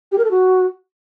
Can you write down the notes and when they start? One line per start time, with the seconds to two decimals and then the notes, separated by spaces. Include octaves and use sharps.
0.12 G4
0.18 A#4
0.25 A4
0.31 F#4